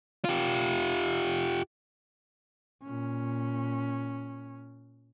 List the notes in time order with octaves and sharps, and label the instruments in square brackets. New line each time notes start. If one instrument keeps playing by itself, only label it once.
[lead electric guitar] F4 G4
[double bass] A#2 C#4